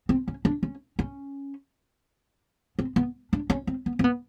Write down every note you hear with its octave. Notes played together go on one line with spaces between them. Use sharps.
C4
C#4
D4
C#4
C#4
C4
B3
D4
C#4
C4
B3
C4
B3